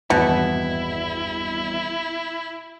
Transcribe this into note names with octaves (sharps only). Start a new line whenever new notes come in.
G#1 E2 G2 B2 E4